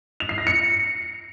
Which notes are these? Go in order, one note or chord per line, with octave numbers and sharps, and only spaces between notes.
F7
C7
A#6
C#7